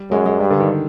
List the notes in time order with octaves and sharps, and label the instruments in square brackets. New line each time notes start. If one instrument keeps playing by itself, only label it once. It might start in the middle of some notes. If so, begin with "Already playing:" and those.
Already playing: [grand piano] G3
[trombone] F#2 [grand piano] G#3
[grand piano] G#3
[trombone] G2 [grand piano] G3
[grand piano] D3
D#3